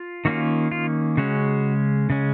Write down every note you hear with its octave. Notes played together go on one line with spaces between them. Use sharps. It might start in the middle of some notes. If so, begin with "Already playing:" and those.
Already playing: F4
D#3 A#3 C#4 F4 F#4
F4
C#3 G#3 C#4 F#4
C#3 G#3 C#4